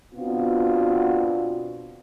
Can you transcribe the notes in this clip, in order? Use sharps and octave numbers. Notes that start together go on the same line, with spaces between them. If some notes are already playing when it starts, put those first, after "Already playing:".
B2 B3 C4 D4 F4 F#4